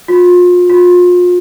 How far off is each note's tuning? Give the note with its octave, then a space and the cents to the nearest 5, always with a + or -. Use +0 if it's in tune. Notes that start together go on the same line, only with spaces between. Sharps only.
F4 +35
F4 +35